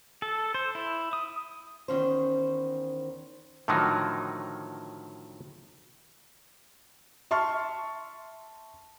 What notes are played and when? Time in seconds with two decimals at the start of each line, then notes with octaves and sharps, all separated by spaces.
0.22 A4
0.54 C5
0.75 E4
1.13 D#6
1.88 E2 D#3 C#4 C5
3.68 A2 D3 D#3 F3 F#3 D#4
7.31 E5 A5 C6 C#6 F6